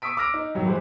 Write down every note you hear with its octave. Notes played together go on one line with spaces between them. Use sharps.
C#6 D#6 E6 B6 D7
D6 E6 F6 A#6 D7
D#4
G2 D#3 F#3 G3
E3 G3 G#3 G4 C5